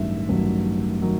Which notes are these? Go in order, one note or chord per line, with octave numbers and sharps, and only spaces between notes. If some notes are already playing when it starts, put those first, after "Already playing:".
Already playing: A1 G2 D#3 F#3 E5
A1 G2 D#3 F#3
D#3 F#3